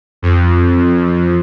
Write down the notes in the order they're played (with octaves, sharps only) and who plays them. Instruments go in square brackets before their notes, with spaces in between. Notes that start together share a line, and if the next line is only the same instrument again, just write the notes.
[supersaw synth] F2